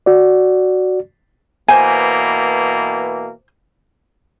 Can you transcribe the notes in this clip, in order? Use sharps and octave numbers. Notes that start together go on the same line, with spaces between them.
F#4 D5
B2 E3 A#3 C5 G#5